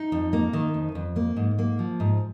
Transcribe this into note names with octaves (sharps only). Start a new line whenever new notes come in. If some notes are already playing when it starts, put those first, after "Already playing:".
Already playing: D#4
F2
A#3
D#3
F2
F2
A#3
G#2
A#3
F3
G#2